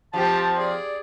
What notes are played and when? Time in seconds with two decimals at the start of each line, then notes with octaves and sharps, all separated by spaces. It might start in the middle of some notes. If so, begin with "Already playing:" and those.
0.14 F3 C4 G4 A5
0.58 G#4 D5